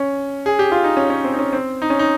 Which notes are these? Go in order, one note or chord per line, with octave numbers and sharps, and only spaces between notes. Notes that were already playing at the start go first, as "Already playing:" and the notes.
Already playing: C#4
G#4
G4
F4
D#4
C#4
C#4
C4
D#4
C#4
C4
D#4
C#4
D#4